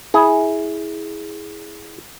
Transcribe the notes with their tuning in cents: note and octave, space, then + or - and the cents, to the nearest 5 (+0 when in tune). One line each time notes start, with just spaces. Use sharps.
E4 -15 G#4 +0